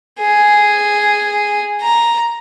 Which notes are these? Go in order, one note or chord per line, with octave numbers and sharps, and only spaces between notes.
G#4
A#5